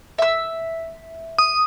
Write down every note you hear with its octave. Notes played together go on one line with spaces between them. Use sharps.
E5 E6
D#6